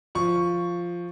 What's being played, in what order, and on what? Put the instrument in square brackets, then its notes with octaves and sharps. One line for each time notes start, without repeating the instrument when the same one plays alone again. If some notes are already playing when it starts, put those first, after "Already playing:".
[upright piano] F3 C#6